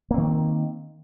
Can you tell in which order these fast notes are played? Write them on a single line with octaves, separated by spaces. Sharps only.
A#3 C4 D#3